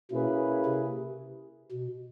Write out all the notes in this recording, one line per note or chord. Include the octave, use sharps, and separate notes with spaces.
B2 A#3 C#4 E4 G#4 B4
C3
B2